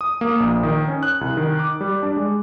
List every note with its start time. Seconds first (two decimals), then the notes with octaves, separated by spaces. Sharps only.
0.01 D#6
0.21 A#3
0.40 A#1
0.63 D#3
0.88 C#4
1.03 F#6
1.21 C2
1.37 D#3
1.59 D6
1.81 G3
2.03 D4
2.17 G#3